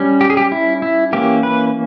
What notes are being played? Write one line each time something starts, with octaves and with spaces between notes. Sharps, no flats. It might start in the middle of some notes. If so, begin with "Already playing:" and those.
Already playing: G3 C#4
G4
G#4
G4
E4
E4
E3 A#3 C#4 G4
B4